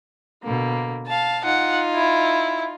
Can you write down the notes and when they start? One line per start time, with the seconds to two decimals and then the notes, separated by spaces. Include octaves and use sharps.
0.43 B2 D3 A#3
1.07 F5 A5
1.44 D#4 F4 F#5
1.95 E4